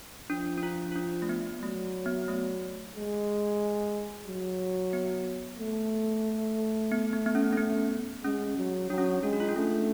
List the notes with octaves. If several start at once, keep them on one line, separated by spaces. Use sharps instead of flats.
F3 D4
D4
F4
F4
D4
A3
B3
F#3 A3
B3
A3
G#3
F#3
B3
A3
B3
B3
B3
C#4
C#4
B3
G#3 C#4
F#3
F#3 D4
C#4
D4
G#3 D4
F#4
F4
D4
A3 C#4